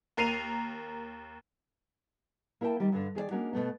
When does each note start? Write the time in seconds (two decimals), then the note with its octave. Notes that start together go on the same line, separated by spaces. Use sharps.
0.17 D#2 A#4 C7 D#7 F7
2.61 A#3 E4 A#4 E5 G5 A5
2.80 D#3 G3
2.92 G2 D3 D4
3.15 D#3 G#4 A#4 D5
3.31 G#3 A#3 C#4 D4 F#4
3.53 B2 A3 B3